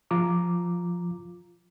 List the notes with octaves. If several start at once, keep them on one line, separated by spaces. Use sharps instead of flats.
F3 F4 A#5 D6